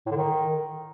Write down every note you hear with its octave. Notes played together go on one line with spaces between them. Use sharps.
A2
D3
D#3